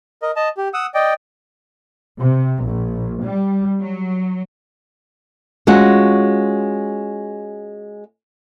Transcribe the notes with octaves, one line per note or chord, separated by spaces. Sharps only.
A#4 D#5
D#5 A5
G4
F#5 D#6 E6
D5 D#5 G5
C3
A#1
G3
F#3
G#3 C#4 F4 F#4